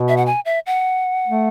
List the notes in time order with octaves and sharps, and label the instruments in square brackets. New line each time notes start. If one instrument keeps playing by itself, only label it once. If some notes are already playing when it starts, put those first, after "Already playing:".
Already playing: [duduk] B2
[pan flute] E5
F#5
G#5
E5
F#5
[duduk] A3